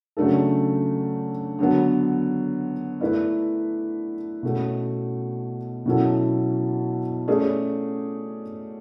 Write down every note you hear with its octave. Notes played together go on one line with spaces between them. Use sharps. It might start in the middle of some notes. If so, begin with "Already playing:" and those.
C#3 F#3 A3 D4 A4
D3 F#3 B3
A3 E4 B4 D5
B2 A3 C#4
B2 F#3 C#4 E4 A4
A3 C#4 G#4 D5